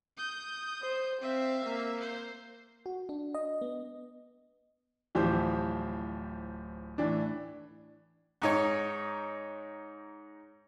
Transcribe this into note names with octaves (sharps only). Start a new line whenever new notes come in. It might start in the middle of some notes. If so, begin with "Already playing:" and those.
D#6 G6
C5
C4 E5 F5
A#3
C5
F#4
D4
D#5
B3
D1 E3 F3 G4 C5 G6
A2 E3 D4
G#2 D#4 C#5